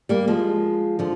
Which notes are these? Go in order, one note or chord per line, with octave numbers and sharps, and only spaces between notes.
G3 A#3
F3 G#3
D3 F3